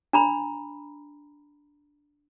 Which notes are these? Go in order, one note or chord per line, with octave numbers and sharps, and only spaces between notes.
D4 A#5 B5